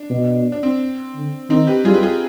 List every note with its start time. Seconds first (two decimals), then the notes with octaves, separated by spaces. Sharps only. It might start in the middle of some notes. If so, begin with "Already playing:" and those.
Already playing: D4
0.10 B2
0.52 D4
0.63 C4
1.15 D3
1.50 D#3 C4 D#4
1.67 G4 B4
1.85 G3 F4 G#4
1.94 B4
2.03 F4 G#4